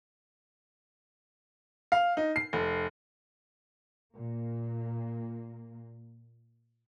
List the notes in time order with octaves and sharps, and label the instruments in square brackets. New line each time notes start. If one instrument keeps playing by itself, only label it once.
[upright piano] F5
D#4
C7
F1
[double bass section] A#2 A#3